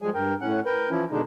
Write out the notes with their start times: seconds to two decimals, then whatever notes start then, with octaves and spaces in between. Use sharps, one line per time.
0.02 G#2 F3 G3 G#3 G#4 G#5
0.14 G2 A#4 G5
0.41 A2 C#4 F#5
0.65 A#4 B4 G5
0.90 E3 F3 C#4 E4
1.11 B2 D3 D#3 G#3 D4 D#4